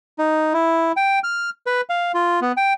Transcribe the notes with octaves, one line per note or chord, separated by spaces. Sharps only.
D#4
E4
G5
F6
B4
F5
F4
B3
G5